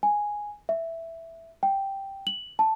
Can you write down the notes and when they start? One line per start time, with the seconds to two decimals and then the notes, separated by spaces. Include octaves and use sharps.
0.03 G#5
0.69 E5
1.63 G5
2.27 F#7
2.59 A5